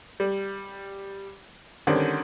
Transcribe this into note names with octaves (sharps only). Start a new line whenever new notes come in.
G3
D3 D#3 G3 C4 C#4